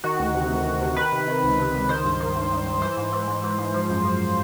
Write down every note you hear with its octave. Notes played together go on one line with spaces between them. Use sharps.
D#3 F#4
D2
C3
D2
D2
C3
D#3 B4
C3
D#3
C#2
C3
C#2
D#3 C5
G2
D#3
G2
G2
G2
E3 C5
G#2
E3
G#2
E3
G#2
F3
F#2
F3